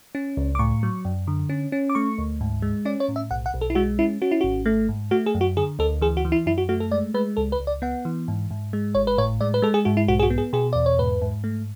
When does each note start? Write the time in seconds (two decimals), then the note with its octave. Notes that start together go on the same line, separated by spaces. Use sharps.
0.15 C#4
0.37 C#2
0.55 D6
0.59 A2 C#6
0.83 F#3
1.05 F#2
1.27 D3
1.49 C#4
1.72 C#4
1.90 D6
1.95 A3 C#6
2.18 D2
2.41 G#2
2.62 G#3
2.85 C#4 D5
3.00 C#5
3.09 A2
3.16 E5
3.30 B1 F#5
3.46 F#5
3.54 B1
3.61 A4
3.70 E4
3.75 G#3 F#4
3.99 C#4 E4
4.22 C#4 F#4
4.31 E4
4.41 G#1 F#4
4.66 A3
4.89 G#2
5.11 A3 F#4
5.26 G#4
5.35 F#2
5.41 F#4
5.57 D3 G#4
5.79 D2 A4
6.01 E3 G#4
6.17 F#4
6.25 E3
6.32 E4
6.46 F#2 E4
6.58 F#4
6.69 A3 F#4
6.80 A4
6.91 G#3 D5
7.14 G#3 B4
7.37 C#2 A4
7.52 B4
7.60 C#2
7.67 D5
7.82 B3 F#5
8.05 E3
8.28 G#2
8.51 G#2
8.73 G#3
8.95 G#1 C#5
9.07 B4
9.18 A2 C#5
9.41 G#3 D5
9.54 B4
9.62 G#3 A4
9.74 G#4
9.85 G#2 F#4
9.97 E4
10.08 B1 F#4
10.19 G#4
10.23 F#4
10.30 B3
10.38 G#4
10.53 B2 G#4
10.73 E2 D5
10.86 C#5
10.99 G#2 B4
11.22 G#2
11.44 A3